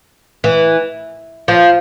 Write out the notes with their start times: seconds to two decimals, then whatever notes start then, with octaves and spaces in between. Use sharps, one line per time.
0.44 E3
1.48 F3